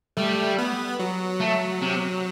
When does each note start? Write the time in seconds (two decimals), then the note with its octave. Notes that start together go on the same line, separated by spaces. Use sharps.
0.17 G3 A3
0.58 B3
0.99 F#3
1.40 A3
1.82 C3